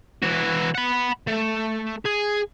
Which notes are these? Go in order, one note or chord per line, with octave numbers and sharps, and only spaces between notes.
E3 F#4
F#5 B5
A3
G#4